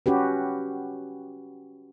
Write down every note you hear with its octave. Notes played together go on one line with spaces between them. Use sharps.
C#4 F#4 G4 B4